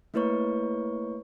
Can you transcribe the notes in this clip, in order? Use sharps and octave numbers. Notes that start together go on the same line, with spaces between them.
A3 A#3 E4 B4 C#5 C#6